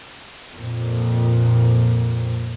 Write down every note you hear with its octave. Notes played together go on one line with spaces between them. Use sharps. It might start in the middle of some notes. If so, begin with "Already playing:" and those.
F2 A#2